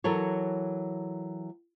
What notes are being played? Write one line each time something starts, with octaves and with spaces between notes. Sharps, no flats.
E3 F#3 A4 A#4 C#5